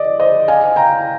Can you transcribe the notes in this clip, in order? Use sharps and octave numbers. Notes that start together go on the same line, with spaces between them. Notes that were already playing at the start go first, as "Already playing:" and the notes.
Already playing: D5 D#5
C5 D#5
F5 G#5
G5 A#5